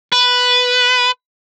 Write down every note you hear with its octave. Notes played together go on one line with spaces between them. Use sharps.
B4